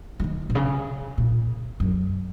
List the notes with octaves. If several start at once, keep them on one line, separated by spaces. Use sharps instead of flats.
F#3
D#3
A#2
C#3
A#2
F#2